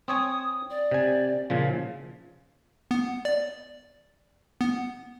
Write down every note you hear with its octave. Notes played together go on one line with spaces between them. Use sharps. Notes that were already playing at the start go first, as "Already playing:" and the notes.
C4 C#5 G#5 D#6
D5
C3 G#5
A#2 C#3 F3
B3
D5
B3